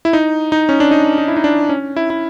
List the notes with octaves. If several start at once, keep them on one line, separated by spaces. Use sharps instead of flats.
E4
D#4
D#4
C#4
D4
D#4
D#4
E4
D#4
D4
C#4
E4
E4